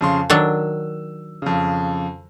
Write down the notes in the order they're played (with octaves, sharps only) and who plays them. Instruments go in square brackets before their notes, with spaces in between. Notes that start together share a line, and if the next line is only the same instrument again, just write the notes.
[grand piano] F2 C#3 C6
[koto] D#3 F#3 D4 [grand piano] E6
[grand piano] F2 C#3